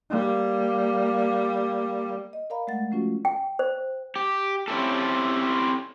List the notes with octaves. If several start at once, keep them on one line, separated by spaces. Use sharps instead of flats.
G3 A#3
D#5
A#4 D5 F5 A#5 B5
G#3 A3 F#5 A6
F3 A3 C#4 F4 F#4
G5
C5
G4
C4 C#4 E4 G4 A4